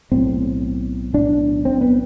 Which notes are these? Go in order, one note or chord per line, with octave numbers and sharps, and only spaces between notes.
B1 A2 C4
B1 A2 D4
C4
B3